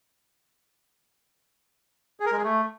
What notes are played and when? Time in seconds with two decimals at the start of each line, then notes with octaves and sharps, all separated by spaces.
2.20 G#4
2.26 A#4
2.32 G#3
2.38 G#4
2.44 A3